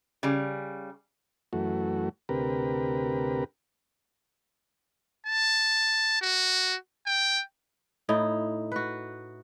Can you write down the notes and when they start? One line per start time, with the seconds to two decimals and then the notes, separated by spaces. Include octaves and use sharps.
0.23 C#3 G3
1.53 F#2 E3 A3 F#4
2.29 D2 C3 G4 A#4 B4
5.26 A5
6.21 F#4
7.07 G5
8.09 A2 D#4 E4
8.72 F#4 B4